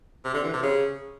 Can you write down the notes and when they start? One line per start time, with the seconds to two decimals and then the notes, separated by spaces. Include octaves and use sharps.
0.25 C3
0.34 D3
0.44 E3
0.53 C3
0.63 C#3